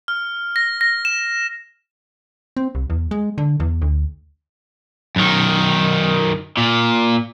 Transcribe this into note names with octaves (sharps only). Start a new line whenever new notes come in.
F6
A#6
A#6
E7
C4
C2
E2
G#3
D3
E2
D2
F#2 D#3
A#2